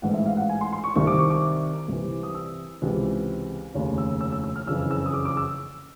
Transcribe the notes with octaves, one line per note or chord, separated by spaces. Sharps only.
A1 G#2 E3 F#5
E5
F5
F#5
G#5
C6
C6
C#6
C2 C3 D#3 C#6
D6
C#6
D6
C2 C3 E3
D#6
E6
C#2 C3 E3
F1 D#2 C#3
E6
E6
E6
E6
F6
F#1 F2 C#3 E3 E6
E6
D#6
D6
D6
E6